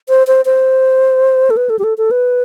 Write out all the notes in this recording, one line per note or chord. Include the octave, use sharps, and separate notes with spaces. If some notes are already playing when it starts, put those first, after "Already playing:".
C5
C5
C5
A4
B4
A4
G4
A4
A4
B4